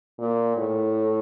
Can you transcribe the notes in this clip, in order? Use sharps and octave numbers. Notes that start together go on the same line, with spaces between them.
A#2
A2